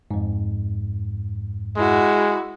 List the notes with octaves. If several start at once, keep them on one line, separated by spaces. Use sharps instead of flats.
F2 G#2
G#3 E4 F#4